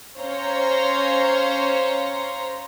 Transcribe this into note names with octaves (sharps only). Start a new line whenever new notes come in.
C#4 C5 C#5 F5 A#5 C6